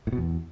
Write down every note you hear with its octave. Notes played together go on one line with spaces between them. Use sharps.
A2
B2
E2